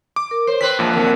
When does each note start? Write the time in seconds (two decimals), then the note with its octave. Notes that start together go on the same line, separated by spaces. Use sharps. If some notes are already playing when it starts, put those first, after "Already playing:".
0.16 D6
0.31 A#4
0.47 C5 C#5
0.61 C4 B4 C5 G5 B6
0.79 A#1 A#2 G#3 A3 B3 A5
0.93 F2 D3 F#3 C4 A#4